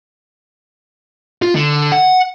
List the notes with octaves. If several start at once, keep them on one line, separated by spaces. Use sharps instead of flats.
F4
D3
F#5